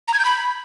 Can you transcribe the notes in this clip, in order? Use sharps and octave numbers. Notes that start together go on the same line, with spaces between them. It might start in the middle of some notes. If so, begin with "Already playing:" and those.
A#5
G#6
G6
B5